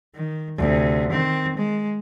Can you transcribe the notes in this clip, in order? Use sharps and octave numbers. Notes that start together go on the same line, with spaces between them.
D#3
D2 C3
D#3 C4
G#3